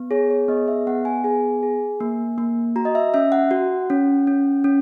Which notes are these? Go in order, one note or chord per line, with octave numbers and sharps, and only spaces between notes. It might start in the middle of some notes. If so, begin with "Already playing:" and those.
Already playing: B3
G#4 C#5
C#5
B3 D#5
E5
B3 F#5
G#5
G#4 G#5
G#4
A#3
A#3
F#4 A#5
D#5
E5
C#4 E5
F#5
F#4
C#4
C#4
C#4